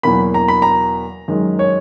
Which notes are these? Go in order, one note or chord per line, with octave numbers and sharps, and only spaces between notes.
E2 B2 F#3 A#3 B5
A#5
B5
A#5
F#2 D#3 G#3
C#5